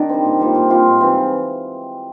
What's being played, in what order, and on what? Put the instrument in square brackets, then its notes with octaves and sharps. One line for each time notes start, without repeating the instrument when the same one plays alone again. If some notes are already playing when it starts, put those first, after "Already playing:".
Already playing: [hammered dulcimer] D#3 [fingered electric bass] D4
[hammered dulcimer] G3 C4
A#2
G3 C4 F4
A#2
G3 C4 F4
G#2
E3 G3 C4